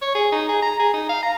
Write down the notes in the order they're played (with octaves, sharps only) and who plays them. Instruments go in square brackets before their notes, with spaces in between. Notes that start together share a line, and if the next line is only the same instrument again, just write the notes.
[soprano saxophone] C#5
G#4
D#4
G#4
A#5
G#4
D#4
F5
A#5